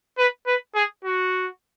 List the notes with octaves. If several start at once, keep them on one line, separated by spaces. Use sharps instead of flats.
B4
B4
G#4
F#4